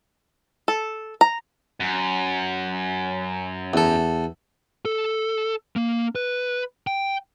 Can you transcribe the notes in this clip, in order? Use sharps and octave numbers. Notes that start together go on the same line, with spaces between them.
A4
A#5
F#2
E2 A4
A4
A#3
B4
G5